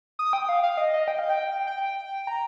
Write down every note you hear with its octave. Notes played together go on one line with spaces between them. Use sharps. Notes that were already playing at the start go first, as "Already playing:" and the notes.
D#6
G5
F5
F5
D#5
D#5
G5
F5
G5
G5
A#5